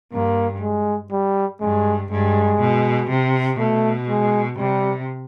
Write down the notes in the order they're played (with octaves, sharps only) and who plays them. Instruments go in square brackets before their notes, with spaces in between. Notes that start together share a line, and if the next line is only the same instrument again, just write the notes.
[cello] G2 [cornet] A#3
[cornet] G#3
G3
[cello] G2 [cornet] G#3
[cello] G2 [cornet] G#3
[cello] B2
C3
[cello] B2 [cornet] A3
[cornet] G#3
[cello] C3 [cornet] G3